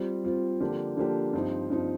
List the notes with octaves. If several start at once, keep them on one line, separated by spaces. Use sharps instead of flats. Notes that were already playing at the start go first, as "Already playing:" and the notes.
Already playing: G3 C4 F4
G3 C4 F4
D3 F3 A#3 D4 G4
D3 F3 A#3 D4 G4
G2 F3 C4 D#4
G2 F3 C4 D#4